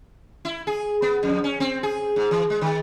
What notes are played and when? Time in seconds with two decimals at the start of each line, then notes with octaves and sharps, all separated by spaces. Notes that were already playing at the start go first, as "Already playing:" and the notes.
0.45 E4
0.67 G#4
1.02 B3
1.23 F2
1.44 C#4
1.60 C4
1.83 G#4
2.16 G#2
2.31 E3
2.50 G#3
2.61 D#3